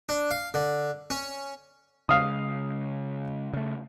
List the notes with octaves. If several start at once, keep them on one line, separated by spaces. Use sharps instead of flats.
D4
F5
D3
C#4
C#3 G#3 F5 D#6
C#3 A3